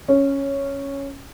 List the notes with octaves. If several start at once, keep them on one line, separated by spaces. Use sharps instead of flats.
C#4